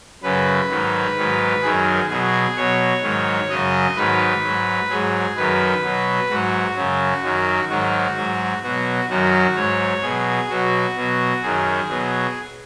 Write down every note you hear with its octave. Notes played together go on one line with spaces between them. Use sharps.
F#2 C#3 F#3 B4
G#2 D#3 F#3
G#2 D#3 F#3
F#2 D#3 F#3 G#4
B2 F#3 G#4
B2 F#3 C#5
G#2 D#3 F#3
F#2 C#3 F#3 D#5
G#2 D#3 F#3 B4
G#2 F#3
G#2 F#3 G#4
F#2 D#3 F#3 B4
B2 F#3
G#2 F#3 F#4
F#2 C#3 F#3
F#2 D#3 F#3
G#2 D#3 F#3 F#4
G#2 F#3
B2 F#3 F#4
F#2 D#3 F#3 F#4
G#2 F#3 C#5
B2 F#3 G#4
B2 F#3 F#4
B2 F#3
F#2 D#3 F#3 G#4
B2 F#3